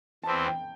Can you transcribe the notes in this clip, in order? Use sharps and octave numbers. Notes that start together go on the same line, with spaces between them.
E2 E3 C4 A5
G5